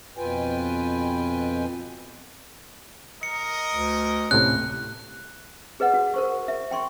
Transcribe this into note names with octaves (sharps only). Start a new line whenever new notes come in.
F2 B2 F4 B4 G5 G#5
A#4 D#5 C#7
D2
A2 C3 C#4 F#6
G#4 B4 D#5 F#5
F#4
A#4 C5 C#6
E5
G5 C6 C#6